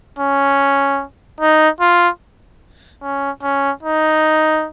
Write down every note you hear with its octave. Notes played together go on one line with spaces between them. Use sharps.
C#4
D#4
F4
C#4
C#4
D#4